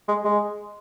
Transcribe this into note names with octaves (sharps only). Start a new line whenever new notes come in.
G#3
G#3